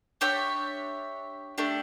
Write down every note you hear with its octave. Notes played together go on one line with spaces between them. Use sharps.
D4 G4 C#5 E5
A3 D4 G4